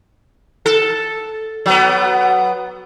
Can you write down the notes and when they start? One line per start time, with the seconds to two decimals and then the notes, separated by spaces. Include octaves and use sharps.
0.66 A4
1.66 F#3 B3